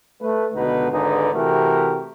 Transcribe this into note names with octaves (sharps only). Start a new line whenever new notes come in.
A3 B4
C#2 B2 D3 B3 D#4 B4
G#1 D3 D#4 G#4 B4
C3 E3 A3 F#4 G4 A#4